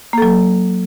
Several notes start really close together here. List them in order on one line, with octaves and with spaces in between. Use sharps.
A#3 A4 F#3